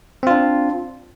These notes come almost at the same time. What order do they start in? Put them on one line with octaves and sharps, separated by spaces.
C4 F4 D4